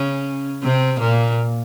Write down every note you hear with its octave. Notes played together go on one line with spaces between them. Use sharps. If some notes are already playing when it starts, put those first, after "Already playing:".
Already playing: C#3 C#4
C3 C4
A#2 A#3